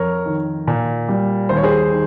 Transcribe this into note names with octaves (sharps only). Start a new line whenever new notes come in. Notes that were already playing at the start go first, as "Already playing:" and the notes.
Already playing: F2 A#4 C#5
D#3
A#2
G3
D#2 C5
C#5
G#4 C5
D#3